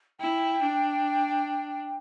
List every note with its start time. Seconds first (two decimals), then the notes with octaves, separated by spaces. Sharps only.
0.19 E4 G5
0.63 D4